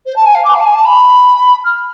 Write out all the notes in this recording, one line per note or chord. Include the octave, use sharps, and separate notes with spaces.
C5
A5
G#5
F5
D6
F5
A5
G#5
A5
B5
F6